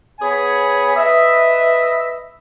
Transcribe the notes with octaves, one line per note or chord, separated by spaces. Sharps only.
B3 G#4 C#5 G#5 B5
B4 D#5 E5